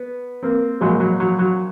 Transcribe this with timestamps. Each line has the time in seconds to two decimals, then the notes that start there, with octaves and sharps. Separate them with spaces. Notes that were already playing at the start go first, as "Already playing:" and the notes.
Already playing: B3
0.43 A#3 C4
0.81 A#1 A#2 F#3 G#3
1.00 F#3
1.20 F#3
1.39 F#3